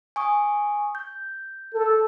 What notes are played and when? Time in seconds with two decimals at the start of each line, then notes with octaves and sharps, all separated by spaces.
0.16 G#5 C#6 D#6
0.95 G6
1.74 A4